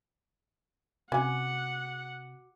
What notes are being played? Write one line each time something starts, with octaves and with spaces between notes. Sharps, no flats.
C3 C#4 F#4 F#5 G#5 D6